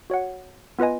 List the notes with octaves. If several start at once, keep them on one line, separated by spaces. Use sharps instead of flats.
F#4 C#5 F#5
B3 F4 B4 D#5 G#5